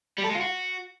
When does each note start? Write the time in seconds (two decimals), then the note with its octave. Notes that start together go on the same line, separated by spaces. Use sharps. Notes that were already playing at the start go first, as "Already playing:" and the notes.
0.18 G3
0.24 A4
0.29 G#3
0.35 F4
0.41 F#4